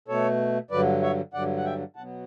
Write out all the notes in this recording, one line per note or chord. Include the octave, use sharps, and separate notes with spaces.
B2 A3 A4 C#5
G2 D3 F#3 B4 D5
C#5 E5
G2 D3 F#3 D5 F#5
F#5
E5 G5
B2 F#3 B3 F#5 A5